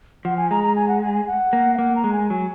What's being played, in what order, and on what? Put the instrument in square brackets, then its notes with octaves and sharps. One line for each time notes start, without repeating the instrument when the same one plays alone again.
[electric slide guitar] F3 [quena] F#5
[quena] G#5
[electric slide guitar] G#3 [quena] A#5
[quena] A#5
G#5
F#5
G#5
G#5
F#5
[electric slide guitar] A#3
[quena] F5
[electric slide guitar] A#3 [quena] F#5
[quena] A#5
[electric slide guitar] G#3
[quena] G#5
[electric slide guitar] F#3